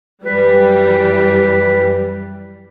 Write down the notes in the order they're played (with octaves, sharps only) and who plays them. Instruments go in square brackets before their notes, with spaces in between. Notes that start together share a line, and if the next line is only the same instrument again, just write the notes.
[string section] F#2 E3 G3 [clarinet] B4